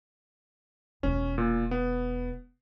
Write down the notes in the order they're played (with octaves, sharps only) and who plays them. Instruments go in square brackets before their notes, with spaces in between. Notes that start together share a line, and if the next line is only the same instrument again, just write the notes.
[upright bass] E1 D#3 [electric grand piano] C#4
[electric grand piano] A#2
B3